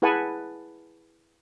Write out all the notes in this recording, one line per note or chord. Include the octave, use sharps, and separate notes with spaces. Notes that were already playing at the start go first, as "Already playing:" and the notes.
E4 G#4 B4 F#5 G#5 A5